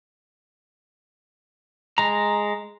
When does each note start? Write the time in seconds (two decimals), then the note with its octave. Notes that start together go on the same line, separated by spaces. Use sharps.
1.98 G#3 A#5